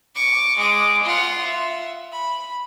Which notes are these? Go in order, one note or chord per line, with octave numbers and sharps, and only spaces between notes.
C#6 D6
G#3 D6
F4 F#5
E5
B5